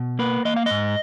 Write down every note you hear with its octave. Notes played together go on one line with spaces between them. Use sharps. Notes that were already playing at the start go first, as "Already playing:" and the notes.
Already playing: B2
A#3 B4
A#3 D#5
F5
G#2 D#5